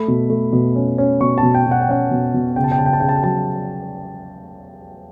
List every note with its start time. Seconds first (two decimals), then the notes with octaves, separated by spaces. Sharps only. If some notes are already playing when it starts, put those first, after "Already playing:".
Already playing: A3 B5
0.08 B2
0.30 A3
0.53 B2
0.76 C#4
0.98 C#4
1.21 B2 C#6
1.38 A5
1.43 B2
1.55 G5
1.66 B2
1.71 F#5
1.81 G5
1.89 C#4 F#5
2.11 B2
2.34 B2
2.56 C#3 G5
2.64 A5
2.72 G5
2.78 C#3 A5
2.86 G5
2.93 A5
3.00 C#3 G5
3.09 A5
3.16 G5
3.23 F#3 A5